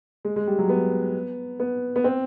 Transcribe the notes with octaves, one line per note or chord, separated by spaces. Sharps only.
G#3
G#3
G3
F#3
B3
B3
B3
C4